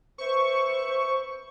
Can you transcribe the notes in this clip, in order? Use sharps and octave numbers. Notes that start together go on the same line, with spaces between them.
B4 C5 E5 C#6